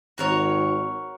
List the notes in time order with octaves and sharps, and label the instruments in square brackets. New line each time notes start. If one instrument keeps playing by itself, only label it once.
[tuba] G#1 [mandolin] F#4 A#4 C#5